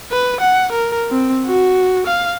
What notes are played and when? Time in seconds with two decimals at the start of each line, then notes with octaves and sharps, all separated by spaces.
0.12 B4
0.41 F#5
0.72 A#4
1.11 C4
1.47 F#4
2.07 F5